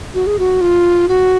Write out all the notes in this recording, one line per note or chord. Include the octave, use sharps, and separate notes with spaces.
F#4
G#4
F#4
F4
F#4